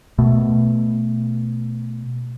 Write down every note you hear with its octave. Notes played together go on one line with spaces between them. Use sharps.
B2 A3